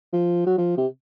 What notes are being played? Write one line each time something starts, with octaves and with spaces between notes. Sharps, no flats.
F3
F#3
F3
C3